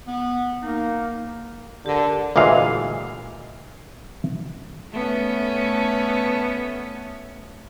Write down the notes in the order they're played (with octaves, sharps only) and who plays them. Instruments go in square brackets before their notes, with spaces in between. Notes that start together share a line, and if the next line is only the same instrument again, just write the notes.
[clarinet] B3
[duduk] A#3 [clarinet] D#4
[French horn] D3 [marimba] G4 A#4
[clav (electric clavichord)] D2 A#2 E3 G#3 F5 G#5
[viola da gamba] A3 B3 C#4